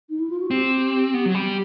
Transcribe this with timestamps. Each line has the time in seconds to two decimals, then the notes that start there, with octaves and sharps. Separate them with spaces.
0.09 D#4
0.19 E4
0.30 F4
0.40 F#4
0.50 C4 G4
1.14 B3
1.25 F#3
1.35 G3